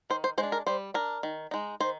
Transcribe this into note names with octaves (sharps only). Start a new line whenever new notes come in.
D#3 C5
C5
G#3 C5
D4
A#4
G3 C5
D4 A#4
D#3
G#3 D#4
D#3 C5